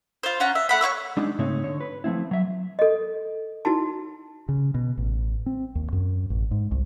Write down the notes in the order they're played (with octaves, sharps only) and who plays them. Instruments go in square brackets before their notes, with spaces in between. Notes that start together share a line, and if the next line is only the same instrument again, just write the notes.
[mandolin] F4 C5
C#4 F4 F#5 A#5
E5
A3 F#5 B5
C#5 F5 C#6 E6
[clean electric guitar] G#3 D4 D#4
G#2 C#3 A3 C4 D#4 C#5
D3 C#5
B4
F3 A3 C4 E4
F#3 E5
[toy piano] A4 D#5
D#4 E4 F#4 A5
[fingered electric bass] C#3
B2
A1
C4
D#2
F#2
A1
G#2
C2